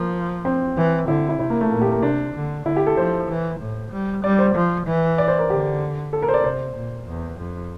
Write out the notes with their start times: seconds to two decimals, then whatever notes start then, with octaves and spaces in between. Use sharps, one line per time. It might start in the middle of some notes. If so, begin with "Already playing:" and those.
Already playing: F3 A#3
0.45 C4
0.77 E3
1.08 D3 E4
1.29 E4
1.39 C3 E4
1.50 A#3
1.61 A3
1.71 A#2 A#3
1.82 G4
1.92 A#3
2.03 C3 D4
2.35 D3
2.66 D3 E4
2.76 G4
2.87 A4
2.97 F3 C5
3.29 E3
3.60 A2
3.92 G3
4.24 G3 D5
4.39 C5
4.55 F3
4.86 E3
5.18 D5
5.28 C5
5.39 A#4
5.50 D3 G4
6.13 A4
6.22 A#4
6.28 C5
6.34 D5
6.44 C3 C5
6.76 A#2
7.07 E2
7.38 F2